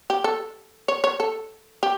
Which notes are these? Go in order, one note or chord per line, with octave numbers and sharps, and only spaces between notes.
G4
A4
C#5
C#5
A4
G4